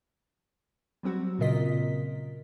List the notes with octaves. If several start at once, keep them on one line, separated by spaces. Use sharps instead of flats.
F#3 G3 C4 F#4
A#2 C#3 F4 A#4 D#5 B6